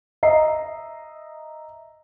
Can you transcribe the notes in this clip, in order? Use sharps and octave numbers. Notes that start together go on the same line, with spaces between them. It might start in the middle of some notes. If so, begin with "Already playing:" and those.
D#5 E5 A#5 C7